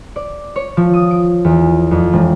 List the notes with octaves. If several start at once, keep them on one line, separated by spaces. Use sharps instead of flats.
D5
C#5
F3
D#6
D7
E2
F2
E1